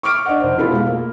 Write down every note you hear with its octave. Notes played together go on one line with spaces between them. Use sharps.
C#6 D6 F6 D7
D4 D#5 F#5
F1 C5
B2 E4 F4 A4 B5
G#3 F5
A#3